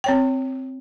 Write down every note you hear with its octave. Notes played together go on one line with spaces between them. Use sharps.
C4 C#5 G5